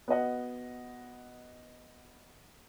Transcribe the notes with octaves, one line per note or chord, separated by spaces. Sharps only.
B3 F#4 D#5 F#5